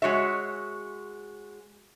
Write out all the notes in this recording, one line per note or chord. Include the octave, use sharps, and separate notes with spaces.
G#3 F#4 C#5 E5